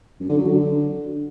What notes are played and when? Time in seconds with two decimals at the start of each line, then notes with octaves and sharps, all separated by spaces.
0.20 F#2
0.29 D3
0.38 F#3
0.47 D3